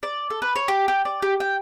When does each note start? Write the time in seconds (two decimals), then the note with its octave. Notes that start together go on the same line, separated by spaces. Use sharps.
0.03 D5
0.30 A4
0.42 B4
0.56 C#5
0.68 G4
0.88 G4
1.05 D5
1.22 G4
1.40 G5